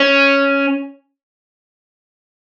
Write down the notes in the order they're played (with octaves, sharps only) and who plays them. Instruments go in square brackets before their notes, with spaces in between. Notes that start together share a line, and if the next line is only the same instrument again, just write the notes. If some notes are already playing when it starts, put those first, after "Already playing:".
Already playing: [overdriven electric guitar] C#4